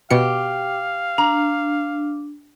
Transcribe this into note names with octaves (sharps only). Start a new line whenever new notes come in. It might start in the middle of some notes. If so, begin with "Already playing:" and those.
B2 G4 F5 C#7
D4 A#5